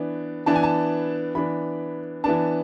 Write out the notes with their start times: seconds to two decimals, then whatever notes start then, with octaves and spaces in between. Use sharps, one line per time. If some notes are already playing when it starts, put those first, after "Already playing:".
Already playing: E3 B3 D4
0.46 E3 B3 D4 A5
0.56 G#5
0.63 A5
1.35 E3 B3 D4 B5
2.24 E3 B3 D4 A5